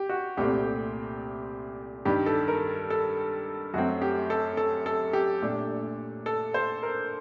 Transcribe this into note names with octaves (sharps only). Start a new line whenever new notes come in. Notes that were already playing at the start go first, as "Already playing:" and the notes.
Already playing: G4
F#4
C2 A#2 A3 C4 G4
G2 D#3 G3 G4
A4
A#4
A4
F#2 F#3 A3 C4 F#4
G4
A4
A4
A4
G4
A#2 A3 D4
A4
C5
A#4